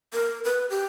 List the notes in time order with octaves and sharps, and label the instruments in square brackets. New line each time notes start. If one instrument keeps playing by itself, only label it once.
[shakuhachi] A#4
B4
G4